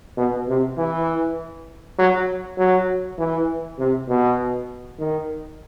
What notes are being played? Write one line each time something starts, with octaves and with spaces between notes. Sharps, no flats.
B2
C3
E3
F#3
F#3
E3
C3
B2
D#3